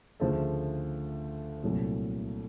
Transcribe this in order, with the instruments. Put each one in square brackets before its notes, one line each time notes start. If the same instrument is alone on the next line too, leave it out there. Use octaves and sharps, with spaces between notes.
[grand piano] D2 C#3 F3 A3
C2 A#2 F#3 A3